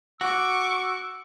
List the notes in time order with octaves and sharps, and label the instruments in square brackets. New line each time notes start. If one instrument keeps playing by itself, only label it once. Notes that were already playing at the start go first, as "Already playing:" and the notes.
[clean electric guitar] F#4 [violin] C#6 D6 [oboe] E6